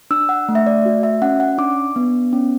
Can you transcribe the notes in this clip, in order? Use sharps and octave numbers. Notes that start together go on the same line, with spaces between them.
D4 E6
F#5
A3
E5
D5
F#4
E5
C#4 F#5
F#5
D4 D6
B3
C#4